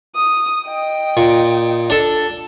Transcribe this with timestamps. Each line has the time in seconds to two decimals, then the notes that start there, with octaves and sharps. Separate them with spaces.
0.16 D#6
0.67 D#5 G5
1.17 A#2
1.90 D4 A4